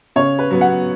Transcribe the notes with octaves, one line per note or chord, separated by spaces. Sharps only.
C#3 C#5
B4
F#3 B3
F#5